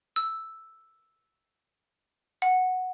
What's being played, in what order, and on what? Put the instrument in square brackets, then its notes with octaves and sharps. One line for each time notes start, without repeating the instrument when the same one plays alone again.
[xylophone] E6
F#5